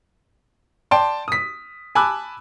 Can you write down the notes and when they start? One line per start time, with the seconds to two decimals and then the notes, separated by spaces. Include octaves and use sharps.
0.91 D5 G5 A5 C6
1.28 D#6 B6
1.95 G#5 A5 B5 D6 E6 F#6